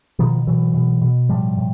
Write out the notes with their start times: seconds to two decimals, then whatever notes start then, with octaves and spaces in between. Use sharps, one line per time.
0.19 B2 D#3 F3
0.47 B2 E3 F#3
0.74 B2
1.02 B2
1.29 A2 F3 G3
1.57 A2